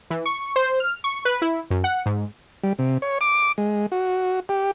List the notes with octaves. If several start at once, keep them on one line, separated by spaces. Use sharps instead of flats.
E3
C#6
C5
F6
C#6
B4
E4
F#2
F#5
G#2
G3
C3
C#5
D6
G#3
F#4
G4